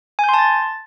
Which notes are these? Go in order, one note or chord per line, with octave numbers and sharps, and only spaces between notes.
G#5 A5 C6 G6 A6